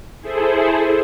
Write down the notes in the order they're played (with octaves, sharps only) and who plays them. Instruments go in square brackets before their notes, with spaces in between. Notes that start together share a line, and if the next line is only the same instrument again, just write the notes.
[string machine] E4 G#4 A4 C5